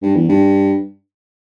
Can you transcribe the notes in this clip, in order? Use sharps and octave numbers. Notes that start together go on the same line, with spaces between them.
G2
E2
G2